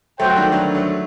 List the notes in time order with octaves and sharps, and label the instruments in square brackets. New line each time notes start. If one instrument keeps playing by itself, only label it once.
[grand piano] F#3 A3 [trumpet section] F#4 C5 G5
[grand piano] A3
D#3 G3
D3 F#3
F#3 A3